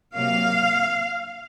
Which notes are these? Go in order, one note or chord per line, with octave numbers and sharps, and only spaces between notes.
C3 F#3 A#3 F5